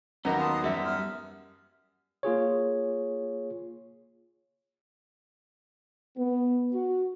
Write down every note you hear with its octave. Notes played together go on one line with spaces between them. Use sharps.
D#2 F#3 B3 C#4 A#4 D#5 F5 A#5
A5 C6 D#6
F#2 G3 B3 E5 F#5
D#6 F6
A#3 F4 G#4 C#5
B3
F#4